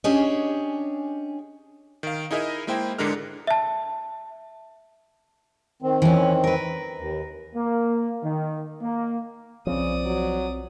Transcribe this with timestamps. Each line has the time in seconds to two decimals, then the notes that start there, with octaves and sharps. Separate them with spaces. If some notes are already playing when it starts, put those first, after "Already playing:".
0.04 C#4 D4 G4 G#4 C#5 D#5
2.03 D#3 F5
2.31 D#4 E4 G#4 A#4 D#5 E5
2.67 G#3 A#3 E4 C5 G5
2.99 G#2 D3 G#3 D4 A#4 F6
3.47 E5 A5
5.82 D#3 C4
6.02 E3 C#4
6.44 A#4 B4
6.98 D#2
7.55 A#3
8.23 D#3
8.82 A#3
9.67 B1 C#3 F3 C4 C#5 D5 D#6
10.05 F#3